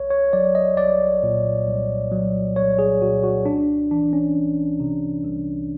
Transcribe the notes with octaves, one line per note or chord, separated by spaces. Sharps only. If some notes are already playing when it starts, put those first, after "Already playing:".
Already playing: C2 C#5
C#5
F#3 D5
D#5
C2 D5
A#2
C2
F#3
C2 C#5
G#4
A#2 F#4
F#4
C2 D4
E3 D4
C#4
C2
C3
C2